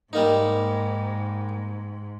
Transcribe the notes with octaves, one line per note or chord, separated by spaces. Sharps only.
G#2 G3 A#3 D#4